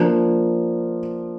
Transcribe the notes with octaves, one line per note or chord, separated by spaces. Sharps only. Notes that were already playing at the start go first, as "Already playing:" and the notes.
Already playing: F3 A#3 D4